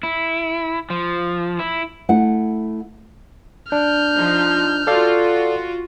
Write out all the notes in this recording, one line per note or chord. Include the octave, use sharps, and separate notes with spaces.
E4
F3
E4
A3 E4 F#5
D4 F6 G6
F3 D#4
F4 F#4 A4 D5 F5